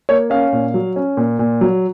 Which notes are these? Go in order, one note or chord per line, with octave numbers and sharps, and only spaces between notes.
A#3 C#5
C#4 F5
A#2
F#3
C#4
A#2
A#2
F#3